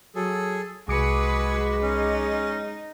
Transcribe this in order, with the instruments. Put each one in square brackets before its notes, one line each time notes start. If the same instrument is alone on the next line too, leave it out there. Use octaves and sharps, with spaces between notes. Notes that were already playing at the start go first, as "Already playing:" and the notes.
[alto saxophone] F#3 [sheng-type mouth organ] G#4 A4
[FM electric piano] C2 D6 C#7 [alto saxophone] G#3 [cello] F#4 B4 [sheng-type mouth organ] G#4
[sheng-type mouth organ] C#4 [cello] D#4